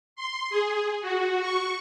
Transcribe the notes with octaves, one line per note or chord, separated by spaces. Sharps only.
C6
G#4
F#4
C#6